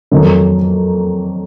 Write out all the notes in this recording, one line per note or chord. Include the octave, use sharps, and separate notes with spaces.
F2 D#3 F#3